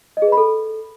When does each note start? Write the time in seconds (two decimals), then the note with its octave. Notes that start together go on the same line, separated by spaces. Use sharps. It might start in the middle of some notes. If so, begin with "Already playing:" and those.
0.17 D#5
0.22 G#4
0.27 B4
0.32 B5
0.37 A4